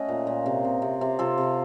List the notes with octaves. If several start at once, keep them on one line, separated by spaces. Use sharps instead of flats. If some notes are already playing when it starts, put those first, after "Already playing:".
Already playing: A3 C#4 D#5 F#5
A#2
A#2
C3
C3
C3
C3
C3 F4 A4
C3